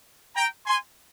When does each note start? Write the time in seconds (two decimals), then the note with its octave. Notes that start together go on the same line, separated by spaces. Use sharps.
0.36 G5 A#5
0.66 G#5 C6